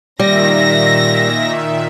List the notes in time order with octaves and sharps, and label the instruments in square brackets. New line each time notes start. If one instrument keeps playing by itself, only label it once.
[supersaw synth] A#2 D#3 E5 [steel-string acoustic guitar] G3 [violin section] A#6